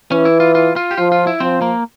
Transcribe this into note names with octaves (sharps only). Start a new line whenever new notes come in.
E3 C#4
E4
F4
F4
F4
G4
F3 F4
F4
E4
F3 C4
A#3